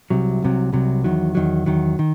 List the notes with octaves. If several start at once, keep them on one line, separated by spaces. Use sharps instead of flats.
C2 C3 F#3
C2 C3 F#3
C2 C3 F#3
E2 D#3 F#3
E2 D#3 F#3
E2 D#3 F#3
D#3